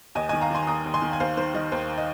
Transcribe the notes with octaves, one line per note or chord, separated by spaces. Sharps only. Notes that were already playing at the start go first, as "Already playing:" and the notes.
D#2 D#5 G#5
D#3 D#5 G#5
F5 A#5
D#3 G#5 C6
D#2 A#5 D#6
D#2
G#5 C6
D#3
G#5
D#2 C5 F5
D#3 C5
D#3 D#5
D#2 C5
D#5